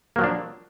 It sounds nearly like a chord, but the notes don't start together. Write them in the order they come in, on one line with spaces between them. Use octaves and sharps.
A#3 F#3 F3 D4